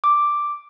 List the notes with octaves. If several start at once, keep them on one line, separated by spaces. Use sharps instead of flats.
D6